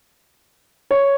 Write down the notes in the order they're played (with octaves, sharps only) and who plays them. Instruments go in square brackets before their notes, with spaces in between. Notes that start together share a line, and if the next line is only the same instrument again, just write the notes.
[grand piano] C#5